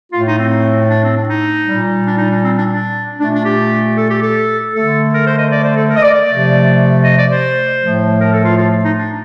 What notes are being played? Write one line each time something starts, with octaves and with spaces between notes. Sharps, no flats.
A2 A3 F4
D#4
C4
D4
C4
D4
D#4
A#2 G3
D4
D#4
D4
C4
D4
D4
A#2 A3 D4
D4
G4
A4
G4
A4
D3 A3 A4
A#4
C5
D#5
D5
C5
A4
A#4
D#5
D5
D5
C3 F3 A3
D#5
D5
C5
A2 F3 A3
A#4
A4
F4
F4
D#4
D4